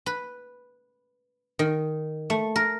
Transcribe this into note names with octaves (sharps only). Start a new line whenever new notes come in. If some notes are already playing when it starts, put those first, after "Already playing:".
B4
D#3
A3
A#4